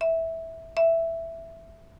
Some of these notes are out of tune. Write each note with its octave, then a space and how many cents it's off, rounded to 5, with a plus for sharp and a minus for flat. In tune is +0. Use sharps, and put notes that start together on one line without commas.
E5 -10
E5 +5